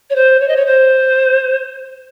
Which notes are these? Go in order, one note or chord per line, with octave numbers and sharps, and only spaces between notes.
C#5
C5
C#5
D#5
C#5
C5